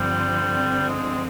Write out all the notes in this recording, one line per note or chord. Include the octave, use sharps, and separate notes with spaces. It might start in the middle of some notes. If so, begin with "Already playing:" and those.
Already playing: G2 D3 F3 G3 C4
G#3